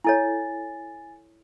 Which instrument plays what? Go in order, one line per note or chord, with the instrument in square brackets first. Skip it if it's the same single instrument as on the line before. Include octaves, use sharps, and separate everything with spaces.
[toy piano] E4 A4 C#5 [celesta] G#5 A6